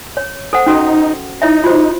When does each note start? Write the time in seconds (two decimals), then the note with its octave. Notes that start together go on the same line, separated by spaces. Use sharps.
0.17 C#5
0.53 A4 C5 F#5
0.66 C#4 D#4 F#4 A4
1.42 D#4 E4 C#5 E5
1.64 F4 F#4 C5